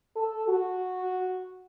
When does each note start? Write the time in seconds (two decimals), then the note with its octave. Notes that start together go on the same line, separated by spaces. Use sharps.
0.16 A4
0.48 F#4